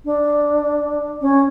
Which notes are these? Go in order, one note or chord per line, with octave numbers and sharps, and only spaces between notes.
D4
C#4